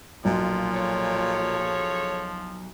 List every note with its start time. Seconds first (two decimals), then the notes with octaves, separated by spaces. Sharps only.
0.25 B1 A#2 F3
0.75 G#4 A4 C#5